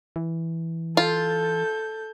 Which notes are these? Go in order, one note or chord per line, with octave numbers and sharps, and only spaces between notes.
E3
F4 A4 G6